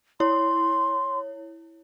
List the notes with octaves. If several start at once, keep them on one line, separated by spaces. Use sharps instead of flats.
E4 C#5 C6